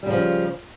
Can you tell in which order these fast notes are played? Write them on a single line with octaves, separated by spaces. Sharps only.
G3 C#3 F3